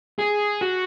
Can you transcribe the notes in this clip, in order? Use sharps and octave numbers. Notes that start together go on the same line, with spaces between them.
G#4
F#4